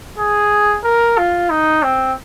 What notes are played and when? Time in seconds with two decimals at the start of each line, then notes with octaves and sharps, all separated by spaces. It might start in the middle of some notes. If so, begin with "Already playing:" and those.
0.18 G#4
0.84 A#4
1.18 F4
1.50 D#4
1.83 C4